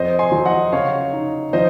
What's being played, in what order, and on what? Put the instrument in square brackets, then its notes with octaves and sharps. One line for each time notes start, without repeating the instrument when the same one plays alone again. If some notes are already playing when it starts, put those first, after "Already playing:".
Already playing: [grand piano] F2 C5 D#5
G#5 C6
F#3
D#5 F#5
C#3 C#5 F5
D#4
F3 C5 D#5